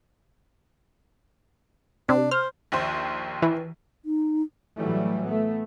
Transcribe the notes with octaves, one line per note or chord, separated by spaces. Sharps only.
C3 D4
C5 F6
A#1 D#2 C5
E3
D#4
A2 E3 F#3 G3 A3
A3 B3